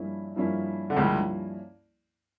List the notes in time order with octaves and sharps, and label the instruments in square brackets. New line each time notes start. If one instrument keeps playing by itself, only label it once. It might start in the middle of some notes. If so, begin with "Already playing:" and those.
Already playing: [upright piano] G2 F3 A#3 C#4 E4
G2 F3 A#3 C#4 E4
[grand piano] D3
[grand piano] C#2 C#3 [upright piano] G2 F3 A#3 C#4 E4